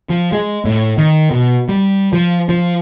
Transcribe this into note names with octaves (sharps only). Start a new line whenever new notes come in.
F3
G#3
A2
D#3
B2
G3
F3
F3